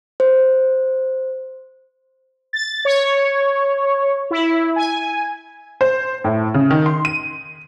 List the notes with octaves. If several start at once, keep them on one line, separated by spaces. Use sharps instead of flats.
C5
A6
C#5
E4
G#5
C5
A2
C#3
D#3
C6
D#7